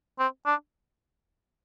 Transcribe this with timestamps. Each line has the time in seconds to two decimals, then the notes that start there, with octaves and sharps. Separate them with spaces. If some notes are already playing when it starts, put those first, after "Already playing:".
0.19 C4
0.46 D4